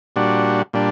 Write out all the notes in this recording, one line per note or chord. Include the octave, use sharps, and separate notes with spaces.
A#2 G3 D4 F#4
A#2 G3 D4